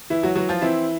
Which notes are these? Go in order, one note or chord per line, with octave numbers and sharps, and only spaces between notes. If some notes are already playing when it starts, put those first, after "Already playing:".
E3 E4
F#3 F#4
E3 F#3 F#4
F3 F4
E3 C4 E4